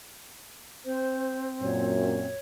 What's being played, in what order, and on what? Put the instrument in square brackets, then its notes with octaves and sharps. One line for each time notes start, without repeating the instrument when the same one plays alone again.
[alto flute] C4 [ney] C5
[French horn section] F#2 A#2 [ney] C#5